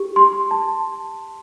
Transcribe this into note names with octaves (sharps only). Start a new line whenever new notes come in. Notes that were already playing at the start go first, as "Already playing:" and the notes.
Already playing: G4
C6
A5